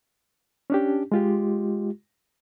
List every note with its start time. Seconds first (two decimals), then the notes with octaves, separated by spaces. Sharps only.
0.70 C#4 D4 G4
1.12 G#3 F4 G4